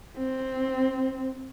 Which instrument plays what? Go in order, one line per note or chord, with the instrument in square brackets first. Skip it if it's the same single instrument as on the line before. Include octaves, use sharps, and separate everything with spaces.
[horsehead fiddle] C4